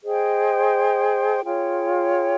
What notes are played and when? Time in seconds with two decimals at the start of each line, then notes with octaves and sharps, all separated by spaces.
0.02 G#4 C5 D#5 G5
1.44 F4 G#4 C#5 G5